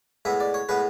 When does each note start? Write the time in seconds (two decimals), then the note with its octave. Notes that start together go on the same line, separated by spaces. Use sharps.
0.25 A2 G#3 B3 E5
0.40 D5
0.54 C#5
0.69 A2 G#3 B3 B4